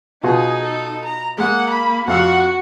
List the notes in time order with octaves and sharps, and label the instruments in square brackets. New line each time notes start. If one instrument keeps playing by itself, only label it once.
[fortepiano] B2 F4 F#4 [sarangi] D#4 [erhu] G#4
[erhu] A4
A#5
[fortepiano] G#3 [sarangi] A#3 [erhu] F#5
[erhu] B5
[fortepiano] F2 F5 E6 [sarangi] F#4 [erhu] F#5